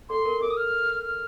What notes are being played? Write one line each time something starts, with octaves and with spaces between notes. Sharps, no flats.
A4 C6
A#4
A#4 D6
D#6
F6
F6